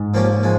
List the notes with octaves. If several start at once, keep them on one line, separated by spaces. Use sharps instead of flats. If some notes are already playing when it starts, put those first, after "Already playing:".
Already playing: G#2
F3 A#3 C#4 G4
F3 G#3